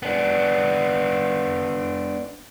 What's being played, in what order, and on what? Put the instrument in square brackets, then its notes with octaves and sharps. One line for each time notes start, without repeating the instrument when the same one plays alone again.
[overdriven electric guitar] B3 D4